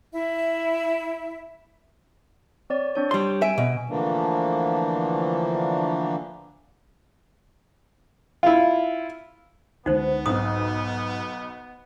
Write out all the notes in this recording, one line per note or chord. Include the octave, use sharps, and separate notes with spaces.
E4 E5
C4 C#5 D5
C4 D4 C#5
G3 C6
E5 G#5 D7
B2
D3 E3 F3 A3 A#3 D4
E4 F4
C#2 D3 G#3 B3 D#4 C5
B1 G#2 B2 D#6